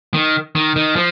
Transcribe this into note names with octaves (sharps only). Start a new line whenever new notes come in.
D#3
D#3
D#3
F3